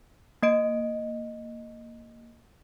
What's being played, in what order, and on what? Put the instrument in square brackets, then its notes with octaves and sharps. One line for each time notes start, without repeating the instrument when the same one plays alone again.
[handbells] A#3 D#5 D7